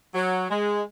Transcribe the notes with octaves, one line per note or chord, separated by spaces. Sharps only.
F#3
G#3